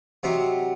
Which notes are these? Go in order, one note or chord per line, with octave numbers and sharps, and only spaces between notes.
C3 F#3 C4 D#4